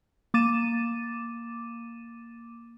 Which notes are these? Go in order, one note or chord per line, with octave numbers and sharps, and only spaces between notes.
A#3 D6 A6 D#7 E7